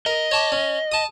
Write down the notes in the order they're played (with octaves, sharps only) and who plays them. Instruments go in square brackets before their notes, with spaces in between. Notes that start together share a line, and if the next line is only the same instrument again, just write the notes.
[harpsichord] A#4 [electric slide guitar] D#5
[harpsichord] C#5 A5 D6
C#4
A5 D#6